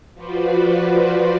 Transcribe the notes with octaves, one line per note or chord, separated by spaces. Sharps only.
F3 F4 F#4 B4 C5 D5